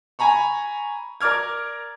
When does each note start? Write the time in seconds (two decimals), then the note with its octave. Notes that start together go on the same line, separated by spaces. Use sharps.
0.19 G#5 A#5 B5 C#6
1.21 A#4 D5 D6 F6 G#6